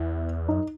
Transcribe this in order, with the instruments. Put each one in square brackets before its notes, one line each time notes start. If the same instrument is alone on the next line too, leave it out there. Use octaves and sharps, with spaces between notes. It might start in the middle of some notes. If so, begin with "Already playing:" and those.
Already playing: [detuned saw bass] E2 [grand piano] E4
[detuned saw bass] F#2 [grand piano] D#4